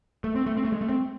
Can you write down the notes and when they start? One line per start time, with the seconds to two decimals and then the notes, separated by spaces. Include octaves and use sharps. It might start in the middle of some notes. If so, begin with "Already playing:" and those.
0.24 A3
0.36 C4
0.46 A3
0.57 C4
0.65 A3
0.72 G#3
0.81 A3
0.89 C4